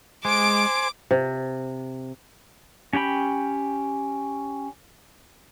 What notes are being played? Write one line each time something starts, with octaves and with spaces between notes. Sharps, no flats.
G#3 C5 G#5 D6 D7
C3
C#4 G4 G5 B5